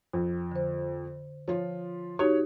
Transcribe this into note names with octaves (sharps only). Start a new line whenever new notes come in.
F2
D3 C5
F3 F4 C#5
D#4 F#4 G4 C#5